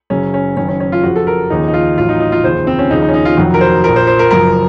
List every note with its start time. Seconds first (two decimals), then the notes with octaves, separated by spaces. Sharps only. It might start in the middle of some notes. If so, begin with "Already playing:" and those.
0.10 F#1 F#2 C#3 C#4
0.34 C#4
0.57 F#1 F#2 D#3 C#4
0.69 C#4
0.80 C#4
0.92 F4
1.03 F2 C#3 F3 F#4
1.16 A4
1.27 A#4
1.50 D#2 C#3 F3 D#4
1.68 D#4
1.74 F4
1.97 A1 A2 F#3 F4
2.09 D#4
2.20 D#4
2.32 F4
2.44 F1 D#2 C#3 F3 C5
2.67 C4
2.79 C#4
2.91 D#2 C#3 F3 D#4
3.02 D#4
3.09 C#4
3.14 D#4
3.25 F4
3.37 F1 F2 D#3 F#3 F#4
3.54 A#4
3.61 C5
3.84 A#1 A#2 F3 A#4
3.96 C5
4.07 C5
4.19 A#4
4.31 F#1 F#2 F3 A#4